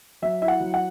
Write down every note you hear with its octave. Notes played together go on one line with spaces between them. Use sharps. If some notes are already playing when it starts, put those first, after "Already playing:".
F#3 E5
E4 E5
F#5
F#3
F#5